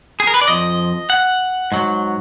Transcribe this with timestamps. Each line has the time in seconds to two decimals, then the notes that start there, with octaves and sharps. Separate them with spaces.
0.20 G#4
0.27 A#4
0.34 B4
0.41 D5
0.48 F2 F3 D#5
1.10 F#5
1.72 G#2 F#3